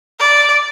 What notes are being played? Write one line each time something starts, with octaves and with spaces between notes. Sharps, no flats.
D5